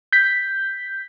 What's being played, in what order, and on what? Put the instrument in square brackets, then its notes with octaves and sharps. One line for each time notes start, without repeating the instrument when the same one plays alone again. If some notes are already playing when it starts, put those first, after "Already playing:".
[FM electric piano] G6 B6